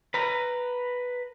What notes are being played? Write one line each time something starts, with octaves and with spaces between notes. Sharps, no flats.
B4 A#5